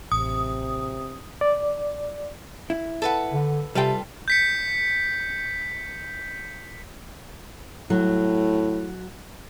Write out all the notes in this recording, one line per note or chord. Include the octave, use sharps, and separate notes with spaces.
A1 C3 D#6
D5
E4
A4 B4 F#5
D3
C3 G3 F4 A4 B4 G5
G6 B6 C#7
A2 F#3